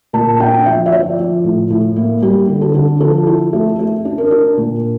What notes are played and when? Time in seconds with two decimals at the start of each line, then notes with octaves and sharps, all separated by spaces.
0.13 A#2 A5
0.40 D4 G5
0.66 F3 E5
0.86 E5
0.92 F3 D5
1.18 F3
1.44 A2
1.70 A2
1.96 A#3
2.22 G3 G4
2.48 D3
2.61 A4
2.75 D3
3.00 F3 A4
3.27 E4
3.53 A3
3.79 A3
4.05 D4
4.18 A#4
4.31 D4
4.57 A#2